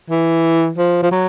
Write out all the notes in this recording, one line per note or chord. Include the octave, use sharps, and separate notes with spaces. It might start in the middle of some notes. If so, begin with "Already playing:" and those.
E3
F3
F3
F#3